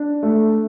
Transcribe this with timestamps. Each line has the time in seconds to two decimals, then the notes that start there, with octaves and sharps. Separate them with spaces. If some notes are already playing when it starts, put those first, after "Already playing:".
Already playing: D4
0.23 A3